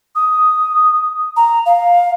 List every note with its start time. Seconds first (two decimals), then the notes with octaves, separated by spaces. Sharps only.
0.16 D#6
1.37 A#5
1.66 F5